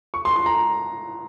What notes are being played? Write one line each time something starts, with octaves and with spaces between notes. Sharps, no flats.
C#6
C6
C6
A#5